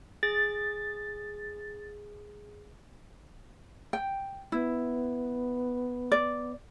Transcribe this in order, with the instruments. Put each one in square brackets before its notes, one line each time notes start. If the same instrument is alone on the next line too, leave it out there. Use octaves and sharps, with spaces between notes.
[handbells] G#4 [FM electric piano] A6
[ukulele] G5
[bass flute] B3 [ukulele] E4
[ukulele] D5